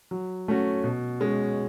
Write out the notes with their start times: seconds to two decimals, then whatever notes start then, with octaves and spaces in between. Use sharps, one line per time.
0.11 F#3
0.48 A3 C#4 F#4
0.84 B2
1.20 G#3 C#4